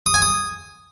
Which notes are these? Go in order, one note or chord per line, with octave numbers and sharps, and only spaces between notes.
D#6
G#5
D#6